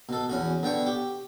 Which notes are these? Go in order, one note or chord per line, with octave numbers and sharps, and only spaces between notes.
B2 A4
E2 C#4 F#4
D3 B3 G5 C#6
G4